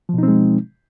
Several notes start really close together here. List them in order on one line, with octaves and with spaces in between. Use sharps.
F3 B2 D#4 C4 G#3